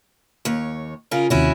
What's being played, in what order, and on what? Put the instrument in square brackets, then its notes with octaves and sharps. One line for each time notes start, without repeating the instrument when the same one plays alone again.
[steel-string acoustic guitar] D#2 C#5
C#3 F4 A#4
[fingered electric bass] D#2 C3 [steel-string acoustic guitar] C#4 E4 F#4